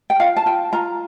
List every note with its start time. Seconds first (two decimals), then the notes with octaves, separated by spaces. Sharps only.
0.10 G5
0.20 F4 F5
0.37 A5
0.46 F4 G5
0.73 F4 A#5